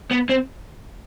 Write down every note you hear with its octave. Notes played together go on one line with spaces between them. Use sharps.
B3
C4